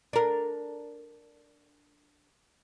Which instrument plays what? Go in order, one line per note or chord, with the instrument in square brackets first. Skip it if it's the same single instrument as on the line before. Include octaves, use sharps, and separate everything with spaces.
[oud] D4 A#4